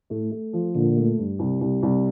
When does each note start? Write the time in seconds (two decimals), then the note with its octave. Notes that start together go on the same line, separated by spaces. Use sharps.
0.10 A2 A3
0.31 A3
0.53 F3
0.75 A#2 D3
0.96 A3
1.18 G2
1.39 C2
1.61 C2
1.83 C2